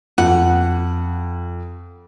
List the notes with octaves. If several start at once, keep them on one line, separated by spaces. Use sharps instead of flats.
F2 F#5